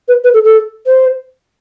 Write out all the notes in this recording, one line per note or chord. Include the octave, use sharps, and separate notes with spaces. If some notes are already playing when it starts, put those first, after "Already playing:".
B4
B4
A4
A4
C5